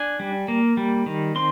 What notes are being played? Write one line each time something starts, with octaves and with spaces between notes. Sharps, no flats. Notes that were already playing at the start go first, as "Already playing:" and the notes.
Already playing: D4 G#5
G3
A#3
G3
D#3
C4 C6